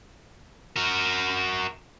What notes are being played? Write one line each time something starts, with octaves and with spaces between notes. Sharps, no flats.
F#4 A#4